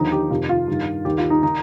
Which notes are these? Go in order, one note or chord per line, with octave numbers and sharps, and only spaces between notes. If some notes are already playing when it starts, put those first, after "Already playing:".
Already playing: D#2 D3 F3 D#4
G4
F2 C3 D#3 F4
F4
G2 D#3
D#2 D#3 G4
F4
D#4
D#3 D#4